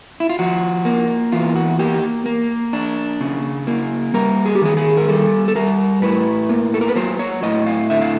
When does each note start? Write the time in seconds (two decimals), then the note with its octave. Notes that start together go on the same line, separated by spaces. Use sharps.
0.20 E4
0.29 F4
0.39 F3 F#4
0.85 A#3
1.32 E2 F4
1.56 F#4
1.79 A#3 G4
2.26 A#3
2.73 D4
3.21 C#3
3.67 A#3
4.14 G3 A#4
4.45 G#4
4.55 G4
4.62 D#3 G#4
4.77 G#4
4.97 A#4
5.08 G3 A4
5.48 A4
5.55 G3 A#4
6.02 A2 B4
6.49 A#3
6.74 A4
6.81 A#4
6.89 B4
6.96 F#3 C5
7.19 C#5
7.42 A2 D#5
7.66 F5
7.90 D3 E5
8.01 F5